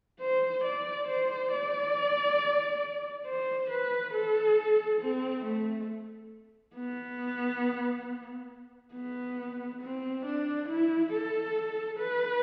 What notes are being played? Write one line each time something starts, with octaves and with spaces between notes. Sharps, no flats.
C5
D5
C5
D5
C5
B4
A4
C4
A3
B3
B3
C4
D4
E4
A4
B4